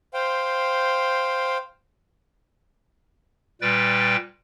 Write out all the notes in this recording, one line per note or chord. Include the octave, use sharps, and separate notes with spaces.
C5 F5 G5
A#2 G3 B4 G5 A6